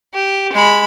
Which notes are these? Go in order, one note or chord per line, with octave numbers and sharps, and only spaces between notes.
G4
G#3 B5